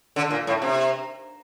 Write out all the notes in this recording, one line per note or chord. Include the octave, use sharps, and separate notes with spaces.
D3
A#2
A2
C3